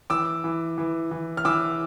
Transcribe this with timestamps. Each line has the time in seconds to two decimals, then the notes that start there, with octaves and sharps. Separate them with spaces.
0.10 E3 D6 E6
0.44 E3
0.78 E3
1.11 E3
1.37 F6
1.45 E3 D6 E6